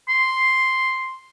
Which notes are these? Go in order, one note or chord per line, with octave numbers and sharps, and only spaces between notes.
C6